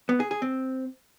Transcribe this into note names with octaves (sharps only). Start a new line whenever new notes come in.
B3
G#4
G#4
C4